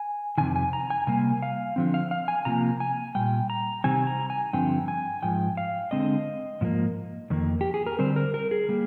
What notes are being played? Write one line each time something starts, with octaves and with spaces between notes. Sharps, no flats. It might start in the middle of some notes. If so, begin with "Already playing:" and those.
Already playing: G#5
F2 C3 D#3 G#5
G#5
A#5
G#5
C3 G3 A#3 G#5
F5
D3 F3 C4
F5
F5
G#5
C3 F3 A#3 A#5
G#5
A#2 G3 G5
A#5
C3 D#3 G3 C4 G#5
A#5
G#5
G2 D3 F3 C4 G5
G#5
G#2 F3 G5
F5
D3 G#3 C4 D#5
G#2 F3 A#3
F2 D#3 A#3
G4
G#4
A#4
D3 G3 C4 C5
A#4
A#4
G#4
G3 A#3